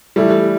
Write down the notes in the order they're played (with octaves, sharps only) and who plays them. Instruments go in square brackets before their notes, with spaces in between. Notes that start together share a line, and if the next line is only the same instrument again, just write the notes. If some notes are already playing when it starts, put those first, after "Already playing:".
[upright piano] E3 A3 E4 [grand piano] G3